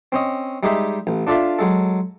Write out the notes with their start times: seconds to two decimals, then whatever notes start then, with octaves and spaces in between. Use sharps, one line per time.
0.12 C4 C#4 D#5
0.63 G3 G#3 D#4 G4 G#4 E5
1.07 A1
1.27 D4 F4 A4 D5 E5 F5
1.59 F#3 G#3 A4